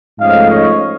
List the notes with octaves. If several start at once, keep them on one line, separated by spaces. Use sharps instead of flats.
G#2 F3 A3 C#4 D#5 F5
C#5 D#5